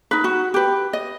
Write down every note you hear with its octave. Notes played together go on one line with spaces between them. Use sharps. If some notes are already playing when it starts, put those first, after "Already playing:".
D#4 B4
F#4
G4 B4
D#5